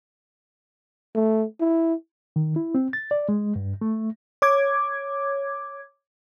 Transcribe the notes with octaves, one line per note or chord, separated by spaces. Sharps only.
A3
E4
D#3
E4
C4
A6
D5
G#3
G2
A3
C#5 D6 G#6